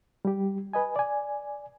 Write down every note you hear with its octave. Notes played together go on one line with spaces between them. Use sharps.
G3 G4
B4 D#5 G#5
D5 G#5